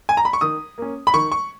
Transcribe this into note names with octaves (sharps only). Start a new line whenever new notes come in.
G#5
A#5
B5
C#6
D#3 D#6
A#3 C#4
B5
D#3 C#6
C#6